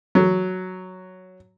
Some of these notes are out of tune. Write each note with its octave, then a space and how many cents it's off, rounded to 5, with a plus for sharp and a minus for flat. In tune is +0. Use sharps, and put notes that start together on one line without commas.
F#3 +0